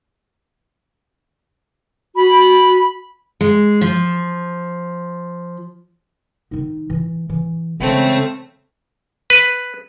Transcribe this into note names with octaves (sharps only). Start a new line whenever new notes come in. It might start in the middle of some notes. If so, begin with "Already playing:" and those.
F#4 B5
G#3
F3
D#3 D#4
E3
E3
C#3 E3 G#3 A3 C4
B4